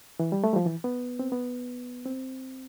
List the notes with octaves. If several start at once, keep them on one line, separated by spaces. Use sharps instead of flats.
E3
G3
A3
G3
F3
E3
B3
C4
B3
C4